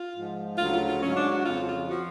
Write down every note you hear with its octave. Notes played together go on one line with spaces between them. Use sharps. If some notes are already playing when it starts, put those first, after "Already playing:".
Already playing: F4
G#2 F3
D2 C#3 F#3 F4
F4
F4
G#2 F#3 C#4
D4
F#4
F2 C#3 F3 F4
F4
F3 F#4